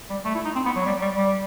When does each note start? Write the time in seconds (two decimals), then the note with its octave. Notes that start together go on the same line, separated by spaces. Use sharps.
0.10 G3
0.25 A3
0.35 E4
0.45 D#4
0.55 C4
0.65 B3
0.76 F#3
0.85 G3
1.02 G3
1.16 G3